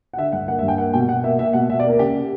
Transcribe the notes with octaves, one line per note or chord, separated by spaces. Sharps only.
F#5
D3 E5
G2 F#5
A#3 F#5
E5
G2
G5
A#3 F#5
B2 G5
B2 F#5
A#3 E5
A#3 E5
B2 F#5
B2 E5
D5
A#3
A#4
C#3 G4